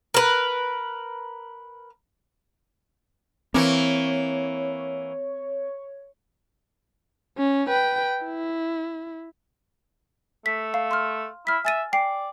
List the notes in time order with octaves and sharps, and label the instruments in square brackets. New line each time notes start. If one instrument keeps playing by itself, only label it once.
[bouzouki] A#4 B4
[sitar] E3 A#3 [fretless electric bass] C4 [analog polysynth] C#5
[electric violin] C#4
B4 G5
E4
[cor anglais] A3 [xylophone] B6
[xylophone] F5
C6 F6
[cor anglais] E4 [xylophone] F6 B6
[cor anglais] E5 [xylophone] G#5 A6 D#7
[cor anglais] D5 [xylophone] G5 C7